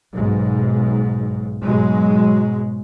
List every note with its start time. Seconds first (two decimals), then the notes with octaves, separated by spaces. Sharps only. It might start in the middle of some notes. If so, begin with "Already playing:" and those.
0.12 B1 G#2
1.64 G#2 B2 F#3 G#3